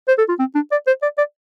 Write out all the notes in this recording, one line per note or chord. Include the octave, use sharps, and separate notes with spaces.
C5
A4
F4
C4
D4
D5
C5
D5
D5